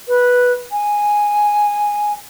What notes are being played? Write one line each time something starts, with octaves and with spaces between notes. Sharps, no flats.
B4
G#5